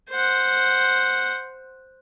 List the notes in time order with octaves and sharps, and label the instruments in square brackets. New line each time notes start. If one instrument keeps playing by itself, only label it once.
[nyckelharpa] C5 F#5